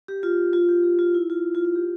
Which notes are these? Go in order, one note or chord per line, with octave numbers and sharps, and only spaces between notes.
G4
F4
F4
G4
G4
F4
E4
F4
F4
F4
G4